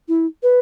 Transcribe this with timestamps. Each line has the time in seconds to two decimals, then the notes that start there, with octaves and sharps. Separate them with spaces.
0.08 E4
0.43 B4